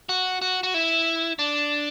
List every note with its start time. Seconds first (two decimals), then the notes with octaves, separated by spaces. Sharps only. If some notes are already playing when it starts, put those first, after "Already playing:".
0.09 F#4
0.42 F#4
0.63 F#4
0.74 E4
1.39 D4